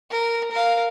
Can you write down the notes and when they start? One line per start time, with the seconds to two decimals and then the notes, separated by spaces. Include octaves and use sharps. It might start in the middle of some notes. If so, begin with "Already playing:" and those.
0.11 A#4
0.51 A#4 F5